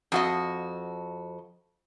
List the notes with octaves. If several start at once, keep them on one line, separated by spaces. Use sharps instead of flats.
F2 F#4 D#5